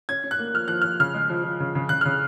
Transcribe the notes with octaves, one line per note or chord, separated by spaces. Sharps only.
C#4 G#6
C#4
F#6
A#3
F3 F6
F3 F#6
F3 F6
C#3 F6
G#3
F3
F3
C#3
C#3
C#3 F#6
C#3 F6